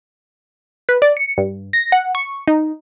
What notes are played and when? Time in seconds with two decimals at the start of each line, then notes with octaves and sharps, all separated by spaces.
0.89 B4
1.02 D5
1.17 C#7
1.38 G2
1.73 A#6
1.92 F#5
2.15 C#6
2.48 D#4